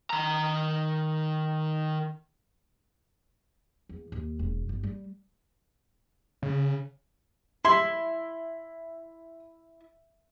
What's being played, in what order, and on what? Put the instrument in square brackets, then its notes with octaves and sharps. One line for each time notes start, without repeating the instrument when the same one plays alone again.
[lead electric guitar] D#3 A#5
[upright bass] E2
D#2
E1
G1
G3
[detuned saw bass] C#3
[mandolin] E4 [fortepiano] C6